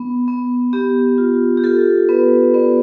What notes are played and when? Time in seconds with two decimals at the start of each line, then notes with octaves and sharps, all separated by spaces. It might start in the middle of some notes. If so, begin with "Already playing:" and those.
Already playing: B3
0.28 B3
0.73 B3 G4
1.18 F4
1.58 G4
1.64 F4 A4
2.09 B3 B4
2.54 B3 D5